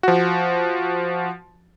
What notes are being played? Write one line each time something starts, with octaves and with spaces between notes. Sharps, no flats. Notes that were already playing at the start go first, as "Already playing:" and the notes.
F3 F#4